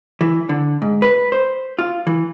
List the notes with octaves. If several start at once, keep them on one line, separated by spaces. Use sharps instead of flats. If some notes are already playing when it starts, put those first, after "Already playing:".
E3
D3
G#2
B4
C5
F4
E3